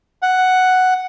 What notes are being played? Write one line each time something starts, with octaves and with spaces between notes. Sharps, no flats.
F#5